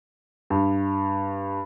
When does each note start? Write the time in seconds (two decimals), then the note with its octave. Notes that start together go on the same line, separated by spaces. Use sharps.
0.50 G2